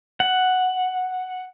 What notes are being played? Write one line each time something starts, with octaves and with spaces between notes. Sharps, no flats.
F#5